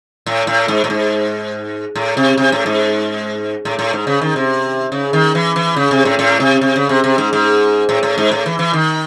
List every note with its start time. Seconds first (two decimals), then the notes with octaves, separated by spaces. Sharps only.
0.26 A2
0.47 A2
0.68 G#2
0.84 A2
0.90 G#2
1.95 A2
2.17 C3
2.38 C3
2.52 A2
2.66 G#2
3.65 A2
3.79 A2
3.93 G#2
4.07 C#3
4.21 D#3
4.36 C3
4.92 C#3
5.13 D#3
5.35 E3
5.56 E3
5.76 C#3
5.91 C3
6.05 A2
6.19 A2
6.40 C3
6.61 C3
6.76 C#3
6.89 C3
7.04 C3
7.18 G#2
7.33 G#2
7.89 A2
8.03 A2
8.18 G#2
8.32 A2
8.46 E3
8.59 E3
8.73 D#3